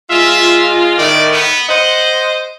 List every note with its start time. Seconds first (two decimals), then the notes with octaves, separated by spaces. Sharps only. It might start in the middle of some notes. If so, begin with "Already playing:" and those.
0.10 G#3 F4 E5
0.98 A2 D#3 D5
1.32 B3
1.69 C5 D#5 F#5